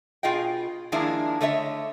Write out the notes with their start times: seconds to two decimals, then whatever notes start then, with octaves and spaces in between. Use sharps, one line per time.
0.23 B2 F4 G#4 D#5 G5
0.92 D#3 F3 G#3 A#3 D4 E4
1.41 D3 A3 C#5 D#5 E5